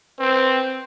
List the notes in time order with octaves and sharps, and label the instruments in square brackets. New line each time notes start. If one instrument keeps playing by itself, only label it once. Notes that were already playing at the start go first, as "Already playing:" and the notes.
[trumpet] C4 [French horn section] B4 C5